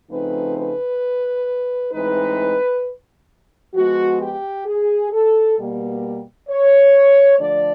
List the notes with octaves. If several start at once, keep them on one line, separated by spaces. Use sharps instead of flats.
C#3 F3 A3 C4 D#4 B4
B4
A2 E3 G#3 C4 D#4 B4
F3 G#3 B3 F#4
G4
G#4
A4
B2 G3 A#3
C#5
D3 F3 A3 D4 D5